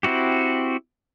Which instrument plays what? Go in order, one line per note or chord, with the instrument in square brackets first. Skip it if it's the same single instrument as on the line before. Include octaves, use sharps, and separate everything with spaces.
[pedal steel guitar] C4 E4 F#4 G4